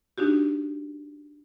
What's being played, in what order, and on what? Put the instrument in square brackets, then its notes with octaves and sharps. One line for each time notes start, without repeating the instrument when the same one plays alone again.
[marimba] D4 D#4 F#4 G4